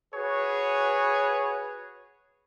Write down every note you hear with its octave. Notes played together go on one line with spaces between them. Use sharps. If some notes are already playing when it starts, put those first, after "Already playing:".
F#4 G#4 B4 C#5